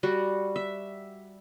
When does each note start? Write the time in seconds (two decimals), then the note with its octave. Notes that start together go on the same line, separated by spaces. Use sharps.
0.03 G3 F#4
0.56 E5